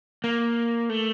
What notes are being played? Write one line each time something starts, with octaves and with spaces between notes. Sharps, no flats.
A#3
A3